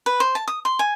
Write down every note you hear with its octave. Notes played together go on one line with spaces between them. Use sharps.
B4
C5
A5
D#6
C6
G#5